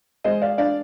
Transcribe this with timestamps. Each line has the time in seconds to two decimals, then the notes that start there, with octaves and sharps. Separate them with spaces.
0.24 G#3 C5 D#5
0.42 D5 F5
0.58 D4 D5 F5